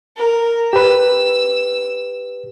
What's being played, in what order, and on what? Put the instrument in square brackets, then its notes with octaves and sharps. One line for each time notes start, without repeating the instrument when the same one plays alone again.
[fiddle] A#4
[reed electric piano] G4 B4 [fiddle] E6